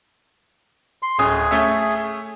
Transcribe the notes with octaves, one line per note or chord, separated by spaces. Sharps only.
C6
D1 C#4 G#4 D#6
A3 C#4 E5